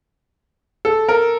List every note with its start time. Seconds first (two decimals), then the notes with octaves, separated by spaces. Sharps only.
0.85 A4
1.09 A#4